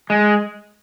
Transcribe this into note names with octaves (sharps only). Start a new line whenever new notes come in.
G#3